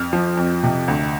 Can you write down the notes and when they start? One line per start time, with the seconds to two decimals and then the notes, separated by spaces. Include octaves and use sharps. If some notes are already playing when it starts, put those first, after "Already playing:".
Already playing: F2 F6
0.13 F3
0.37 F2
0.63 C3
0.88 D2